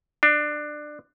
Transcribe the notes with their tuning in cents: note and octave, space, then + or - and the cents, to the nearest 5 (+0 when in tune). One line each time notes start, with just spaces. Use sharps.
D4 +20